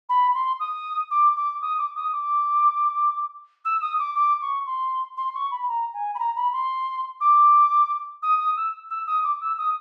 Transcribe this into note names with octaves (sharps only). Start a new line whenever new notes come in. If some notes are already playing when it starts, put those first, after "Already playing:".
B5
C6
D#6
D6
D6
D#6
D6
D#6
D6
E6
D#6
D6
D6
C#6
C6
C6
C#6
B5
A#5
G#5
B5
A#5
B5
C6
D6
D#6
D#6
E6
E6
D#6
D6
E6
D#6